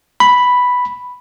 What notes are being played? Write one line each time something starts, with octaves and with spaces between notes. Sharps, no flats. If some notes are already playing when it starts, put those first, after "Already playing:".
B5